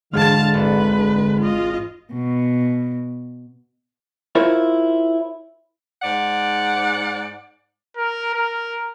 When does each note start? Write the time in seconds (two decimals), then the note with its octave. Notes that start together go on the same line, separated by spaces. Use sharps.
0.13 E1 G#2 D3 G#3 F5 A5 F6
0.54 G#1 B4
1.40 F4 D#5
2.13 B2
4.35 E4 F4 A#4 C5 C#5
6.02 G#2 D5 F#5
7.97 A#4
8.34 A#4